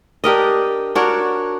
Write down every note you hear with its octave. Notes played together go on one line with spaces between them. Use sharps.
D4 G4 A#4 D#5
D4 F#4 A#4 C#5